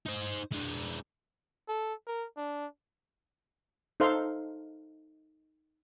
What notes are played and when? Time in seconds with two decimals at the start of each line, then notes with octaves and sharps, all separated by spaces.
0.06 D#4 C5
0.52 G#3 D4
1.68 A4
2.07 A#4
2.37 D4
4.00 D#4 A4 C5 F5 C6